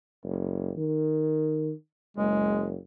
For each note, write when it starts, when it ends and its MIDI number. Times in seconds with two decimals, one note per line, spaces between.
0.24 0.72 30
0.77 1.71 51
2.17 2.76 30
2.17 2.69 56